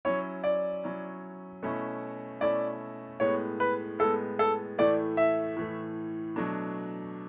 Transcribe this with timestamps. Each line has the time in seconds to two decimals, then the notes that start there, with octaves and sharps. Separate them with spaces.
0.05 F#3 C#4 E4 C#5
0.44 D5
0.84 F#3 C#4 E4
1.63 B2 A3 C#4 E4
2.41 B2 A3 C#4 E4 D5
3.20 A2 G#3 B3 C#5
3.60 B4
3.99 A2 G#3 B3 A4
4.39 A4
4.78 A2 E3 A3 D5
5.17 E5
5.56 A2 E3 A3
6.36 B2 F#3 A3 D4